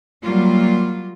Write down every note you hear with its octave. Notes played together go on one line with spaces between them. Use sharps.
F#3 G3 A#3 F4